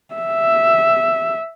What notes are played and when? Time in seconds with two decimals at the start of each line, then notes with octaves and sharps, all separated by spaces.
0.14 E5